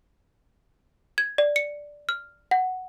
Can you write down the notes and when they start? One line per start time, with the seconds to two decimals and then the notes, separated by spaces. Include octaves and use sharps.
1.18 G#6
1.38 D5
1.56 C#7
2.09 F6
2.51 F#5